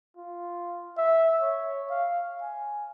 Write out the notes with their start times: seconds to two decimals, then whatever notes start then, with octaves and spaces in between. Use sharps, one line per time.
0.17 F4
0.97 E5
1.41 C#5
1.90 F5
2.42 G#5